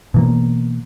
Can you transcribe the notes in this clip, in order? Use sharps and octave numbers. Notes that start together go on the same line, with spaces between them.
B2 E3 A#3